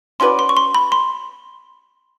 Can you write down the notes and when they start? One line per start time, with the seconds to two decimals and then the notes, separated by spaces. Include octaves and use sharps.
0.20 C#4 F#4 B4 D5 C6
0.39 C6
0.49 C#6
0.57 C6
0.75 B5
0.92 C6